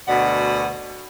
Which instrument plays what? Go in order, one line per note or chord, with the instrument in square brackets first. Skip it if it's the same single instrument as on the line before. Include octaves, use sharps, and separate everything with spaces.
[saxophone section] D2 B2 D5 F#5